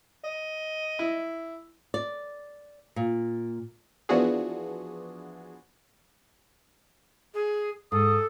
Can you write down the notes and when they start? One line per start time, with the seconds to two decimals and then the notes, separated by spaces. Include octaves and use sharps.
0.24 D#5
0.99 E4
1.94 D5
2.96 A#2
4.09 E3 F3 B3 D4 F#4 G#4
7.34 G#4
7.92 G#2 A4 D#6